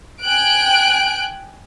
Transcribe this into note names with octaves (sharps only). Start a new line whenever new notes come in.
G5 G#5 F#6 D7